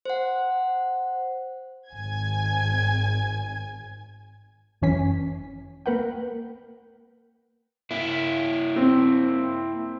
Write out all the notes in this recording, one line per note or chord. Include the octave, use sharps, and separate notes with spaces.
C5 F#5
G#1 G#5 G#6
G1 F#2 E3 C#4 G#5 B6
A#3 A#4 B4 F#5 G5
A#3 E4
C4